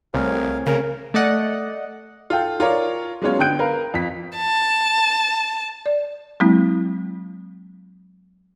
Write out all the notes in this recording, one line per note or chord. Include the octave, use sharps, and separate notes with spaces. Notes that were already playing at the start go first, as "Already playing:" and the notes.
C2 A3 C4 G#4 A#4 C#5 F5
C#3 A#4
A3 D5 D#5 F#5
F4 A4 G5
F4 A#4 C#5 D5
F#3 G#3 B3 C#4 F4 C#5
D3 B3 G5 F#6 G6 D7
A#4 B4 F5
F2 B6
A5
D5
F#3 G#3 A#3 C4 E4